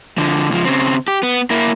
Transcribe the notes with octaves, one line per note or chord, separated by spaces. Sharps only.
D3 F3
C#2 F3
C#3 C4
G4
B3
A#3 E4